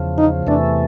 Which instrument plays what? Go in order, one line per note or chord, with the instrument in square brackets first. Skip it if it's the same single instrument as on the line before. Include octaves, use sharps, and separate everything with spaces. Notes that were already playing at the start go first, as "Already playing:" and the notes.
Already playing: [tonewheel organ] E2 C#3 F3
[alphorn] D#4
[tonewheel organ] E2 C3 E3 A3 [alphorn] D4